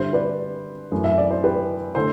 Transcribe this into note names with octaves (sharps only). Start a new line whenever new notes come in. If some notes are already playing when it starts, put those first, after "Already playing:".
Already playing: G2 D3 G3 C5 E5
B4 D5
F#2 E3 A3 E4
E5
D5
C5
G4 B4
D3 A3 A4 C5